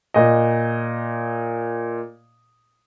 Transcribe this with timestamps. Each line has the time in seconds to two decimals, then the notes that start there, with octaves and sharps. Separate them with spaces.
0.14 A#2 D#5